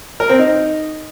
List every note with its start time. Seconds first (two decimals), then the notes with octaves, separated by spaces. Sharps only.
0.20 A#4
0.29 C4
0.39 D#4